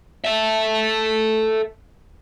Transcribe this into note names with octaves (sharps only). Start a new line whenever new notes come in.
A4 E5